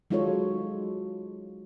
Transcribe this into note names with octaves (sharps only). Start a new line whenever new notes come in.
F#3 G#3 D#4 F4 A4 C#5